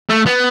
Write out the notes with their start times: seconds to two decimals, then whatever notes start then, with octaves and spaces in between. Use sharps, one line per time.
0.09 A3
0.26 B3